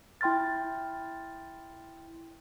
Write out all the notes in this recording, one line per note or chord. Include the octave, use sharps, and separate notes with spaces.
E4 G5 C6 F6 A6